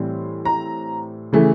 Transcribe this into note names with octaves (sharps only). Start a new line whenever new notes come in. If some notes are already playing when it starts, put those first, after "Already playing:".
Already playing: A2 E3 G3 C4
A#5
C#3 E3 A3